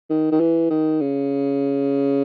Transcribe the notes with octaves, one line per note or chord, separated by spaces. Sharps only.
D#3
D#3
E3
D#3
C#3